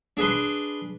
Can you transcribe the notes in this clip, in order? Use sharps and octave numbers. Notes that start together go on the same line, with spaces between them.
D4 G#4 B4 C6